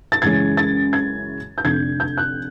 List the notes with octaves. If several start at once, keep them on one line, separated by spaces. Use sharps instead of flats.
A6
F#2 C#3 E3 G#3 C#4 G#6
A6
G#6
G6
F1 F2 D3 G#6
G6
F#6